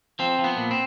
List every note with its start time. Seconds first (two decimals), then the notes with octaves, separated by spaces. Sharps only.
0.19 F3 C4
0.39 F3
0.44 B3
0.57 A#2
0.71 C4